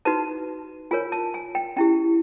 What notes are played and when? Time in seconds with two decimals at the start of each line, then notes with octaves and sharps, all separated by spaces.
0.05 D#4 F#4 B4 A5
0.91 F4 A#4 C#5 G#5
1.12 A5
1.34 G#5
1.55 G5
1.76 C#4 E4 G4 G5